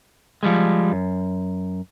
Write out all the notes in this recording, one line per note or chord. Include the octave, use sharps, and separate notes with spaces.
F3 G3 G#3
F#2